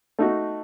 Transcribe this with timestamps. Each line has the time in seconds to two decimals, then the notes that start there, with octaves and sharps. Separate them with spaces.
0.19 A3 D#4 F#4